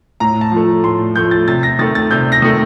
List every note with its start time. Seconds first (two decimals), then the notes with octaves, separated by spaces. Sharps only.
0.20 A2 A#5
0.41 A5
0.52 F3 A3
0.84 A2 C6
1.15 F3 A3 G6
1.31 A6
1.48 C3 A6
1.63 A#6
1.79 D#3 A3 A6
1.95 A6
2.11 C3 G6
2.32 A#6
2.42 D#3 A3